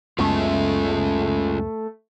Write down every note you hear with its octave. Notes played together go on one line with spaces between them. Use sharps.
C#2 F#2 G#3 A3 B3 C#4 F4